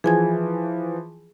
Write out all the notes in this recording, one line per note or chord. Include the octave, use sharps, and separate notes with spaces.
E3 F3 G#4 G#5 G#6